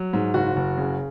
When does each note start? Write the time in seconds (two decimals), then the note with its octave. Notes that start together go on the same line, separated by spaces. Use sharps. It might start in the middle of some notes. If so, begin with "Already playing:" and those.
Already playing: F#3
0.13 G#2
0.34 F#1 F#4
0.56 F#1
0.78 C#3